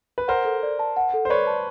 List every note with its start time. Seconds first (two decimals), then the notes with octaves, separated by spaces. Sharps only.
0.18 B4
0.28 A#4 C5 F#5
0.45 A4
0.63 D5
0.79 A5
0.97 F#5
1.14 A4
1.25 C5
1.30 B4 C#5 D5
1.47 A5